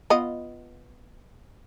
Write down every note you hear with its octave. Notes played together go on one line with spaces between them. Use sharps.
B3 F4 D#5